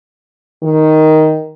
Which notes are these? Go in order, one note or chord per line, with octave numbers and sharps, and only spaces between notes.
D#3